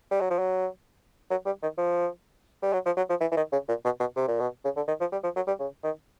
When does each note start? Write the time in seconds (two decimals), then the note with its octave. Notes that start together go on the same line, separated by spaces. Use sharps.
0.11 G3
0.21 F#3
0.30 F3
0.39 F#3
1.31 F#3
1.46 G3
1.63 D#3
1.78 F3
2.63 G3
2.73 F#3
2.86 F3
2.97 F#3
3.09 F3
3.21 E3
3.31 E3
3.36 D#3
3.52 C#3
3.69 A#2
3.85 B2
4.00 B2
4.16 C3
4.28 A#2
4.40 B2
4.64 C#3
4.76 D3
4.88 D#3
5.00 F3
5.12 G3
5.23 F3
5.36 F#3
5.47 G3
5.59 C#3
5.83 D#3